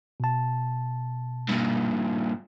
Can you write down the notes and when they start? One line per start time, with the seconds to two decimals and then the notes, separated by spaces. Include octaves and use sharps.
0.20 B2 A5
1.49 G2 A#2